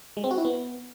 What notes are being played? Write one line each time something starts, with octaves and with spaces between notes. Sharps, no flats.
G#3
C4
F#4
E4
B3